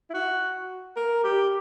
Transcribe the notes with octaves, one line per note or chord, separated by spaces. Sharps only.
E4
F#4
A#4
G4